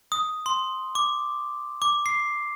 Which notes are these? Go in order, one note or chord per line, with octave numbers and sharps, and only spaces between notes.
D#6
C6
D6
D6
C7